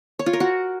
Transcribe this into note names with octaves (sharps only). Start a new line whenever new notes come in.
C#5
F4
A#4
F#4